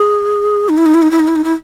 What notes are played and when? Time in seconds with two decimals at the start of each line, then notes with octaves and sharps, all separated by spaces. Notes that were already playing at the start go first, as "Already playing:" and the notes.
Already playing: G#4
0.69 D#4
0.78 E4
0.86 D#4
0.94 E4
1.02 D#4
1.11 E4
1.20 D#4
1.28 E4
1.36 D#4
1.44 E4